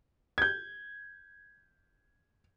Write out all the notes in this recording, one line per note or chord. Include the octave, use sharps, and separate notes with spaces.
G6 G#6